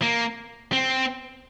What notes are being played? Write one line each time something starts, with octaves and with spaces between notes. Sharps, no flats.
A#3
C4